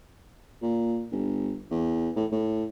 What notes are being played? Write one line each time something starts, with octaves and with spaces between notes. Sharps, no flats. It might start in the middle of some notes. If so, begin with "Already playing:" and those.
A#2
G1
E2
A2
A2